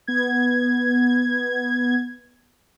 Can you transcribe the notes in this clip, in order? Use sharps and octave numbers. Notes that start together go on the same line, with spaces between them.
B3 G#6